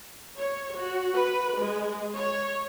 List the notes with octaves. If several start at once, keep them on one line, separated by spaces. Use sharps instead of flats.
C#5
F#4
B4
G#3
C#5